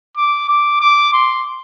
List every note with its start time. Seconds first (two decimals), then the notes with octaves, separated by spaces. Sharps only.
0.17 D6
0.49 D6
0.81 D6
1.13 C6